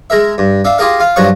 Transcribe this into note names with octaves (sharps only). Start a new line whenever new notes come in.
G#3 A#4 E5
G2
D4 E5 F5
F4 G4 G#4 A#4 F5
F4 F5
G2 F3 F#3 F#5 C#6